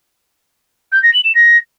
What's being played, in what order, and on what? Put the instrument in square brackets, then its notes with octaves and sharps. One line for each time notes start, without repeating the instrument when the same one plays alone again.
[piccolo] G6
A#6
F#7
E7
A#6